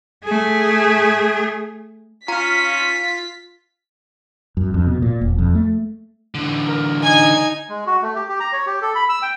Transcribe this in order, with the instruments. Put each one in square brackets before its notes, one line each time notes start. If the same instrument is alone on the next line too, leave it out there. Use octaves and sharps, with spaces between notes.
[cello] A3 G#4
[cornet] C#4 [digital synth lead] F4 [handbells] A#5 F6 [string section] B6
[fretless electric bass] F#2
F2
B2
A#2
E1
F2
A3
[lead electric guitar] D3 E3
[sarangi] A#4
[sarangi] D#4 [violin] G#5 G#6
[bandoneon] G#3
F#4
A3
G4
G4
A#5
C#5
G4
A4
B5
E6
G5